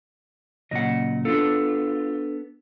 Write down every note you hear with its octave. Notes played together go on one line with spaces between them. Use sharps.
A#2 C#3 F#3 D#5 F#5
B3 D4 F4 A4